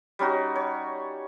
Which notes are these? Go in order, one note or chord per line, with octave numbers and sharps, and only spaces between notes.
G3 C#4 D#4 F#4
C#5